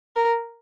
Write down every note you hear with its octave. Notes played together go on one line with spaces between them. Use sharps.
A#4